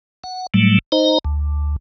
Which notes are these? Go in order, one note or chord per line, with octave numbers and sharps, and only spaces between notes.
F#5
A2 F#3 G3 A3
D#4 C5 D#5 A#5
D2